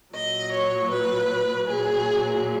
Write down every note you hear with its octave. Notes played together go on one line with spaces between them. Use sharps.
A#2 F#3 D#5
C#5
B4
A#2 F#3 G#4